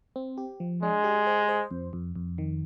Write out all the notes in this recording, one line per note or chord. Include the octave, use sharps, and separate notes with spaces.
C4
G4
F3
G#3 D4
G4
C5
C5
F2
F2
F2
D#3